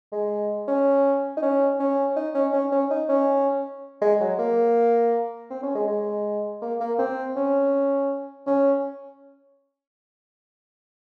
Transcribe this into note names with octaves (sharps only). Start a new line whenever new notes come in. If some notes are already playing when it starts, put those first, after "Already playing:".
G#3
C#4
D#4
C#4
C#4
D#4
C#4
C#4
C#4
D#4
C#4
G#3
F#3
A#3
C4
C#4
G#3
G#3
A#3
A#3
C4
C#4
C#4